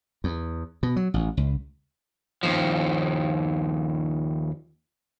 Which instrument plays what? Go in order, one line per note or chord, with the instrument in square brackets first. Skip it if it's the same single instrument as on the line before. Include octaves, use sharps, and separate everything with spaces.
[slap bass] E2
B2
F#3
A1
C#2
[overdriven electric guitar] D#2 F3